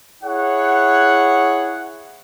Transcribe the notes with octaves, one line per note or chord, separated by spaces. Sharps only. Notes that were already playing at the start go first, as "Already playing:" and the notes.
E4 G#4 C#5 F#5